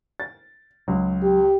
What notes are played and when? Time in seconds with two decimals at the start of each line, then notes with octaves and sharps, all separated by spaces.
0.20 A6
0.88 C#2 F#3
1.22 G4